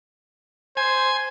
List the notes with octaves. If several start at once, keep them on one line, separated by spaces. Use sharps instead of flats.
C5 G#5